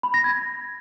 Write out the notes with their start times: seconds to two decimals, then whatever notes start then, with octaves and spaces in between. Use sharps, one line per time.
0.03 B5
0.14 A#6
0.24 G#6